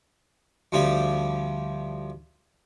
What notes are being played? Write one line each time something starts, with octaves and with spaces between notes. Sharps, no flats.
D2 F3 G3 G4